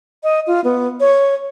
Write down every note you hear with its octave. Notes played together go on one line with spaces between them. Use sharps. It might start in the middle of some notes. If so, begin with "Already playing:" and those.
D#5
F4
B3
C#5